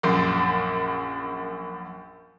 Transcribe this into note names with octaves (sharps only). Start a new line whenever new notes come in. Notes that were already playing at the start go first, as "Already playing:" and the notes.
A#1 F#2 C6